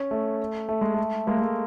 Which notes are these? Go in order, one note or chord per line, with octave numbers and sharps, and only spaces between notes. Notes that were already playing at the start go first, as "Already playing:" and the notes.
Already playing: C#4
A3
A3
G#3
A3
G#3 A#3
G#3
A3